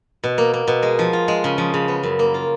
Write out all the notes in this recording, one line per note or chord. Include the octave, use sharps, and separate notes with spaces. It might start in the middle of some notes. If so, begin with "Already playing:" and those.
B2
A#3
A#3
B2
G#3
F3
F4
G#3
C#3
F3
C#3
B3
F#2
A#3
F4